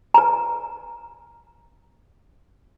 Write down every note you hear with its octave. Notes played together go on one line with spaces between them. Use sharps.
B4 A#5